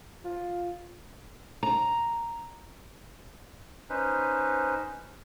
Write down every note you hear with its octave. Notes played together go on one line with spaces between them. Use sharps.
F4
A#5
C#4 D#4 B4 C5